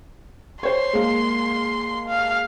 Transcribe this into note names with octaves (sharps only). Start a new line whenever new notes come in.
C5 C#5 C6
G#3 A#3
F5